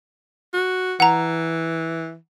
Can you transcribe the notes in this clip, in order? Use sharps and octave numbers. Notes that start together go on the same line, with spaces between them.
F#4
E3 F#5 A#5